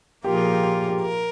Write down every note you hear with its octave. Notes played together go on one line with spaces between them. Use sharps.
A#2 F3 A#3 F4 G4 A#4
G#4
G#4
G4
G4
G#4
G4
A#4